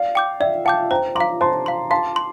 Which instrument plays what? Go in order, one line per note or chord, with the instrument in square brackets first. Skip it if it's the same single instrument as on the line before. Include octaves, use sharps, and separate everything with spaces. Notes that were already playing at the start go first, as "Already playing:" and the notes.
Already playing: [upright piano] D5 F5
[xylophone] G5 D6 G6
[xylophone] D5 [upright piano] E5 G5
[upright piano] F5 A5 [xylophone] G5 D6 G6
[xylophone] C5 [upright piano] G5 A#5
[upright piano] A#5 D6 [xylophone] C6
[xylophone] F5
[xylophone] C5 [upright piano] A5 C6
[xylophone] F5 C6
[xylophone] F5 [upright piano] A5 C6
[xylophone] C6